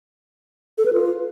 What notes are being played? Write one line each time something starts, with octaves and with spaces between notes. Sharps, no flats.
A4
B4
F4